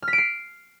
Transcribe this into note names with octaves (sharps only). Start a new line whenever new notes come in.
F6
B6
D7
C7